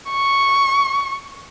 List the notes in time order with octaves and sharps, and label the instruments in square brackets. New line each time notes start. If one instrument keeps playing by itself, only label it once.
[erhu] C#6